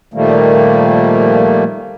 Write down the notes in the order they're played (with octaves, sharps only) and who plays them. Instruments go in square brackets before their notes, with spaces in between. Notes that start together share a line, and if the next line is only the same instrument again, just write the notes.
[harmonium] A#2 D#3 F3 G3 A3 A#3